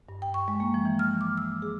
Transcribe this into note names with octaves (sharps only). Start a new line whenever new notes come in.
G2
G5
C#6
G#3
A#3
F3
E3
F6
D6
E6
G#4